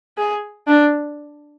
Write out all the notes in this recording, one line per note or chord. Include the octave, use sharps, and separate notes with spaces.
G#4
D4